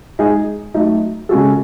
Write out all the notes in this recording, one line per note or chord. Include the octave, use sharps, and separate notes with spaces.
G#3 D#4 G#4
F#3 A3 D#4
C#3 G#3 C#4 F#4 A4